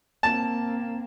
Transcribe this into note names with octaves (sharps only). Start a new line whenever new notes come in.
A#3 C4 A5